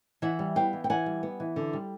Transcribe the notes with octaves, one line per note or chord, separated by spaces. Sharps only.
E3 E5 F#5
G3
B3 F5 G5
E3
G5
E3 F#5 G#5
G3
B3
E3
D3
G3